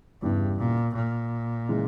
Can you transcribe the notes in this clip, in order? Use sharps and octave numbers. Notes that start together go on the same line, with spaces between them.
E2 G2 C#3 G3 B3 E4
A#2
A#2
C#3 E3 G#3